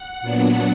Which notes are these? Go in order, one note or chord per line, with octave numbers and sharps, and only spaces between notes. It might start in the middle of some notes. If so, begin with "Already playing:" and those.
Already playing: F#5
A#2 F#3 B3 D4